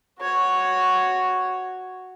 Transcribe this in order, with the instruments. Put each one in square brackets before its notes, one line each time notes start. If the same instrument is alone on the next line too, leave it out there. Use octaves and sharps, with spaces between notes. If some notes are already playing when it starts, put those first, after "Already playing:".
[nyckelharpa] F#4 C#5